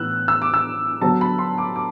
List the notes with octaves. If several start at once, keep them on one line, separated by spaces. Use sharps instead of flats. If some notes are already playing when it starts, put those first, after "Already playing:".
Already playing: A2 E3 B3 E6 F#6
E6
D6
E6
D3 F#3 B3 A5
B5
C6
D6
D6